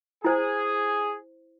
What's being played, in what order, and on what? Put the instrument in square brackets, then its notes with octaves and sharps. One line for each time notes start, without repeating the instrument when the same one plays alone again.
[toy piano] E4 C5 [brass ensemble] G#4